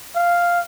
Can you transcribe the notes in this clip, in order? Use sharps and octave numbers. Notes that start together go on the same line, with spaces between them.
F5